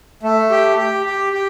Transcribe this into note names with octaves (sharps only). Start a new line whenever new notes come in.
A3
G4
G4
G4
G4